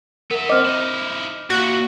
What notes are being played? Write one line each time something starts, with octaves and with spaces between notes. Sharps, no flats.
B3 A#4 E5
C4 D#5 D6 F6
D#4 E4
A#2 E4 F#4